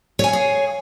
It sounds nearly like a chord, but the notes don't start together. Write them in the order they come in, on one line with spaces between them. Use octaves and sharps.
C#5 G#5 F5 G#4